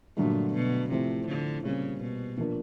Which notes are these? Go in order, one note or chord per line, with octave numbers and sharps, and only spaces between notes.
G2 A#2 D3 F#3 A3 D4
B2
A2 C3 F3 A3 C4
D3
A#2 C#3 G3 C4
B2
A#2 F3 A#3 D4